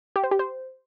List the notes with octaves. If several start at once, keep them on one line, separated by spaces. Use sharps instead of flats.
G4
C5
G4
C5